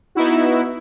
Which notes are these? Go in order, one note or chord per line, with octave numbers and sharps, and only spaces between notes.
B3 D#4 E4 F#4